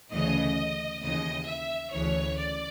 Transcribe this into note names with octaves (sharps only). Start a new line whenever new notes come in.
D2 C#3 E3 D#5
D#2 C#3 E3 D#5
E5
D2 C#3 E3 C#5
D5